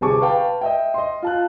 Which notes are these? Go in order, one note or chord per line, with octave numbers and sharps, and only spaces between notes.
G1 C3 G#4 A5 C#6 D6
B4 F5 G5 A5
D#5 E5 G5
D#5 C6
F4 A5 F#6